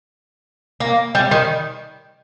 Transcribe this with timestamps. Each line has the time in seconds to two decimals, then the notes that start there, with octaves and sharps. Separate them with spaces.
0.80 A#3
1.15 G3
1.31 D#3